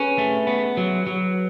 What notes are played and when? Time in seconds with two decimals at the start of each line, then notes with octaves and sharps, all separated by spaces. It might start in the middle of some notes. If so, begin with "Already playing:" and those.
Already playing: C#4 G#4 B4
0.18 A3
0.47 B3
0.77 F#3
1.07 F#3